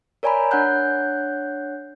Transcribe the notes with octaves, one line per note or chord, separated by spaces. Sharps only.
A#4 C#5 D5 G#5 A#5 B5
D4 C#5 F#5 F#6 G6